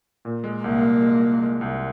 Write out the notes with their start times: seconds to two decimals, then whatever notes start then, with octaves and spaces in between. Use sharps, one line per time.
0.25 A#2
0.44 G#3
0.64 C2 A#3
0.83 C2
1.02 G#3
1.22 G#3
1.42 G#3
1.61 C2